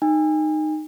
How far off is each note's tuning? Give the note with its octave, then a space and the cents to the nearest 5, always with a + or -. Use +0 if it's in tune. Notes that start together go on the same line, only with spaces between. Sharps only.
D#4 -15 G#5 -35